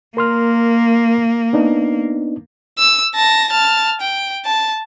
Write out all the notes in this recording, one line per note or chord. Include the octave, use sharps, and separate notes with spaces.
A#3 A#4 C6 F6
B3 D4 D#4
E6
A5 A#6
A5 F6
G5
A5